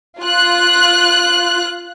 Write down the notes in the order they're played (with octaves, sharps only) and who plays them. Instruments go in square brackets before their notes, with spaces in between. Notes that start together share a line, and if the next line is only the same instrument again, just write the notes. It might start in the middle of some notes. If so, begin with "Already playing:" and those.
[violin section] F4 F#6